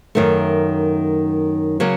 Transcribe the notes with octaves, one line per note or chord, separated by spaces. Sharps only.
F#2 D#3 A3
C#3 F#3 A#3